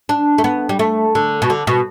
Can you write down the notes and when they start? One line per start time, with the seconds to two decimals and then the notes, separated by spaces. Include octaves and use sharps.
0.09 D4
0.38 A3
0.44 B3
0.69 G3
0.79 A3
1.15 D3
1.42 B2
1.50 D3
1.67 B2